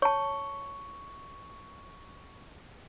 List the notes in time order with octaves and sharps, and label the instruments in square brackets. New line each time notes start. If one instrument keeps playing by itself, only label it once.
[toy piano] C#5 A5 [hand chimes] C#6